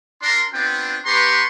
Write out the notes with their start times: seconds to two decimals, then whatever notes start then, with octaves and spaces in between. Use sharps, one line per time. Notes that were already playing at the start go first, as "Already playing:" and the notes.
0.22 D4 A#4 C6
0.53 B3 C4 D4 F4 G5
1.06 B3 G4 B4 A#5 C6 C#6